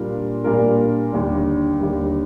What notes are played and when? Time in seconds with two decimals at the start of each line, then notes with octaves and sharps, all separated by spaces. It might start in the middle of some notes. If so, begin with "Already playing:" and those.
Already playing: A#2 G3 D4 F4 A#4
0.44 A#2 G3 D4 F4 A#4
1.12 D#2 D3 G3
1.80 D#2 D3 G3